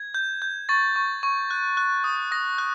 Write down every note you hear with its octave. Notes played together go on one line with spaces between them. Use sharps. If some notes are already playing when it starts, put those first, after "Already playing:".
Already playing: G#6
G6
G6
C#6 A6
C#6
C#6
F#6
F#6
D#6
D#6 A#6
F#6